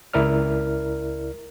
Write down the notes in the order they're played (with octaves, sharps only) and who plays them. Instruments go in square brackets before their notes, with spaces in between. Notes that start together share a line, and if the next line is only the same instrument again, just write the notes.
[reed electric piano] C#2 E4 A#4 D5 F6